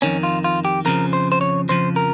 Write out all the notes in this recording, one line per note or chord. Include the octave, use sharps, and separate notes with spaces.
F2 D#3 C#4
F4
F4
G4
F2 C#3 F3 A#4
C5
C5
C#5
F2 C#3 F3 C5
A#4